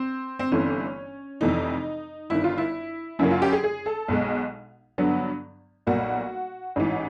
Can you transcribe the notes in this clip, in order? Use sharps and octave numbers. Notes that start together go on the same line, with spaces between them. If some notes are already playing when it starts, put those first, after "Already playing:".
Already playing: C4
C4
G1 G2 E3 A3 C4 C#4
F1 F2 C3 E3 A3 D#4
G1 G2 D#3 E4
F4
E4
F#2 C#3 F#3 A#3 E4
F4
G4
G#4
G#4
A4
B1 B2 G#3
G2 D3 F#3 B3
B1 A#2 G3 A#3 F#4
A1 G#2 E3